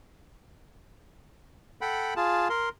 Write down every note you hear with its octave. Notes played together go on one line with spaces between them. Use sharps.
A4 F#5 G5 B5
F4 G#4 A5
A#4 C6